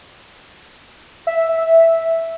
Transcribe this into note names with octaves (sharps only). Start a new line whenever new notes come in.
E5